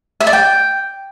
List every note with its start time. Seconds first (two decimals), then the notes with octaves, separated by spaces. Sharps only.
0.20 E5
0.27 D5
0.33 G5